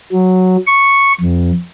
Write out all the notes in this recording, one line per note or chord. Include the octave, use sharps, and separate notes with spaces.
F#3
C#6
F2